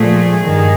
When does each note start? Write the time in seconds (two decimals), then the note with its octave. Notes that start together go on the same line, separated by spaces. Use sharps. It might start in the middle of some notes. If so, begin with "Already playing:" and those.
Already playing: A#2 F3 A3 G#4
0.45 G2 D#3